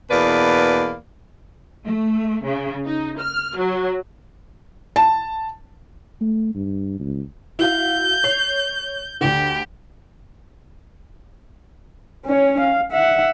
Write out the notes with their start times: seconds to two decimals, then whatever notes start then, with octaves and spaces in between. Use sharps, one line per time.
0.11 E2 B2 A#3 B4 D5
1.84 A3
2.45 C#3
2.86 D#4
3.19 F6
3.57 F#3
4.96 A5
6.21 A3
6.55 G2
6.99 C#2
7.59 E4 F#4 F5 G6
8.24 C#5 C7
9.21 D2 D3 G4
12.26 C#4 C#5
12.61 F5
12.92 E5 F#5